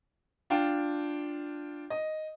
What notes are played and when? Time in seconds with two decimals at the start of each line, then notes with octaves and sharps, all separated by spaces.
0.50 D4 F4 G5
1.90 D#5